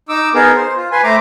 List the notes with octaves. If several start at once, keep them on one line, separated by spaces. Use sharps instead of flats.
D#4 D6 E6
B3 D#4 G#4 A#4
C5
F4
B4 G#5 C6
A3 C5 A#5 D6